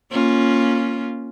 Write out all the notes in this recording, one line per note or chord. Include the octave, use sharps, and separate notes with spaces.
A#3 C#4 F4